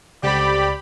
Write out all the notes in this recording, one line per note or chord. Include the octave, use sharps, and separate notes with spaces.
C#2 D3 G3 C4 G4 D5 B5